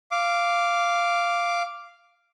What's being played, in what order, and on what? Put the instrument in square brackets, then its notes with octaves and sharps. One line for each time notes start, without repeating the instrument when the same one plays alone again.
[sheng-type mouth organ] F5 D6